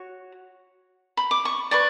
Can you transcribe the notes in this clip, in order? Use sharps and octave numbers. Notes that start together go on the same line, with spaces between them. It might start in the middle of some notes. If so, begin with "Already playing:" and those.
Already playing: F#4 C#5
B5
D6
C#6
B4 D5 C#6